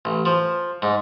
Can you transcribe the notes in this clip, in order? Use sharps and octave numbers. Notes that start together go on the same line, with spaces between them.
A1
F3
G#2